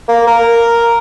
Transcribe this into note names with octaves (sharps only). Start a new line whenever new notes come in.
A#3
A#4